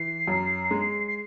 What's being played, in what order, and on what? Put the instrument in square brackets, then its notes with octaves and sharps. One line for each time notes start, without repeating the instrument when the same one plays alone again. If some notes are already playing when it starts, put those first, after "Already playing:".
Already playing: [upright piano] E3 [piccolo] C7
[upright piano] F#2
G#3
[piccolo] C7